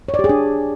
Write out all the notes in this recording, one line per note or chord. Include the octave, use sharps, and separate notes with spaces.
C#5
D5
G4
G#4
D4